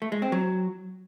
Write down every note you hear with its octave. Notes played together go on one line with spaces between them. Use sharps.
A3
G#3
C4
F#3